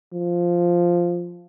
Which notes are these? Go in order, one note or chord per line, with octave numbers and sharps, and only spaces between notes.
F3